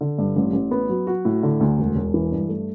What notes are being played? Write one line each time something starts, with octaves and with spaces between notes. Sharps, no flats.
D3
G2
A1
A1
B3
F#3
F#4
A2
D3
D2
E1
E1
E3
G2
A3